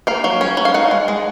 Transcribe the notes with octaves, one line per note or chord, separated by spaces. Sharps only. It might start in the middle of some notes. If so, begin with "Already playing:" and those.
A#3 F5
F#3
C#4
F#3
F5
D#4 F#5
G#3
G#3